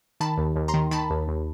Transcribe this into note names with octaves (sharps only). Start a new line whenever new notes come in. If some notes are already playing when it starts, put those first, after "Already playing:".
D#3 A5 B5
D#2
D#2
A#5 C6
D#3
D#3 A5 B5
D#2
D#2